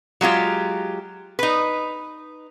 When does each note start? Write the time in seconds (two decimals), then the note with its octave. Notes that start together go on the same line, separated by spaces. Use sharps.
0.21 F#3 G#3 F4 G4
1.39 D#4 B4